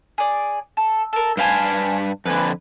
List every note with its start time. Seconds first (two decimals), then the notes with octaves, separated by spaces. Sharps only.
0.18 G#4 D5
0.77 A4
1.13 A4 A#4
1.37 G2 B4 C5 F5 G#5 A5
2.25 F2 D3 B4 G#5